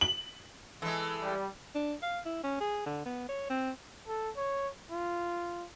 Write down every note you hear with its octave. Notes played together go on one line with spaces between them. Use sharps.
F#7
E3 G#3 A4
G3
D4
F5
E4
C#4
G#4
D3
B3
C#5
C4
A4
C#5
F4